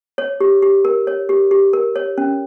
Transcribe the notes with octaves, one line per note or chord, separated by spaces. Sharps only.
C#5
G4
G4
A#4
C#5
G4
G4
A#4
C#5
C#4